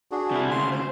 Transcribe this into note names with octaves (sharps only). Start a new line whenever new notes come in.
D4 F#4 G#4
C3 E4
D2 C#3 C6
C5